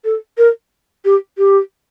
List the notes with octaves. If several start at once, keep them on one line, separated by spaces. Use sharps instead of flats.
A4
A#4
G4
G4